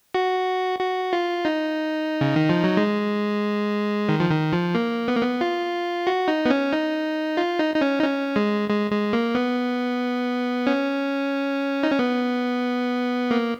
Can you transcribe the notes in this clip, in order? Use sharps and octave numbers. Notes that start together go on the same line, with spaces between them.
F#4
F#4
F4
D#4
C#3
D#3
F3
F#3
G#3
D#3
F3
D#3
F3
A#3
B3
A#3
B3
F4
F#4
D#4
B3
C#4
D#4
F4
D#4
D#4
C#4
D#4
C#4
G#3
G#3
G#3
A#3
B3
C#4
D#4
C#4
B3
A#3